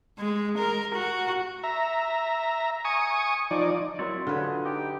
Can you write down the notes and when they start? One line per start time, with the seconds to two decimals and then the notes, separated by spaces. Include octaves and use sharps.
0.18 G#3
0.58 A#4
0.95 F#4
1.63 E5 A#5
2.85 G#5 C#6 D#6
3.51 F3 D#4 D5
3.99 F#3 C4 E4 A#4 C#5 D5
4.27 D3 F4 G#4 B4
4.65 D#4 G4